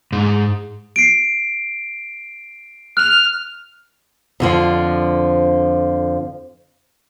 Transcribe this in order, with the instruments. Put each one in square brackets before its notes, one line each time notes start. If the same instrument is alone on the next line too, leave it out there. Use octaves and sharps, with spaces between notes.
[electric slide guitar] G#2
[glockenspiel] C7 D7
[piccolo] F6 [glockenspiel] F#6 F7
[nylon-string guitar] F2 D3 F3